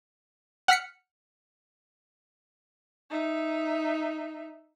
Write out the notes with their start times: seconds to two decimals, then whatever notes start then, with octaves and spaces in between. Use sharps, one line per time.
0.68 F#5 F6 B6 C#7
3.10 D#4 E5